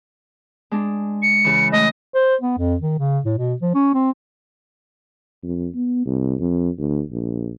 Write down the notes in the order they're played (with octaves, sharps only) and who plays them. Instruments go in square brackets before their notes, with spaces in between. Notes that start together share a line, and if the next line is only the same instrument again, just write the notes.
[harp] G#3 D4
[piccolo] C#7
[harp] C#3 E3
[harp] A3 [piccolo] D#5
[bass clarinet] C5
B3
F2
D#3
C#3
A2
B2
F3
C#4
C4
[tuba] F2
B3
C2
F2
D2
A#1